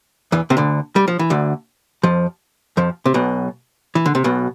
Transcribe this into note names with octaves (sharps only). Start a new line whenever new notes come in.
E2 E3
C3
D2 D3
G3
F3
E3
D2 D3
F2 F3
F2 F3
C3
B1 B2
E3
D3
C3
B1 B2